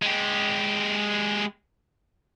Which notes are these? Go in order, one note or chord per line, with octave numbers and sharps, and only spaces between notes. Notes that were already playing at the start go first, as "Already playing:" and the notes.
G#3 G4